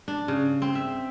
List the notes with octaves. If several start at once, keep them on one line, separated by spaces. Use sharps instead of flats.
D4
C#3
C4
E5